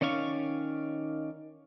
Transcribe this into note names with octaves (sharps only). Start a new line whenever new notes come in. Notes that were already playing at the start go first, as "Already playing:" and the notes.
D#3 C#4 D5 F5 C#6